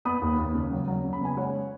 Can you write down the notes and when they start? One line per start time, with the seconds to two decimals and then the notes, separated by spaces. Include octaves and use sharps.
0.05 B3 B5 D#6
0.22 D#2
0.38 D#2
0.54 C#3
0.71 F#3
0.88 F#3
1.04 C#3
1.13 B5
1.21 B3 G#5
1.37 G#3 C#5 F#5